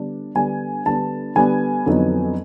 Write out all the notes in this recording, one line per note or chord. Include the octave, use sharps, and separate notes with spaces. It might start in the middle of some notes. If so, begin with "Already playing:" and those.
Already playing: D3 G3 B3 D4
D3 G3 B3 D4 G#5
D3 G3 B3 D4 A5
D3 G3 B3 D4 G#5
F2 D3 F#3 B3 D#4